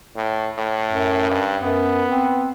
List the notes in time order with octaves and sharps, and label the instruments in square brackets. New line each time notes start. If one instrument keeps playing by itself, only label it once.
[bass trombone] A2
A2
[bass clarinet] F#2
[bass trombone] G2
[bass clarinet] F#2 [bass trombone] B3
[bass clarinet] C4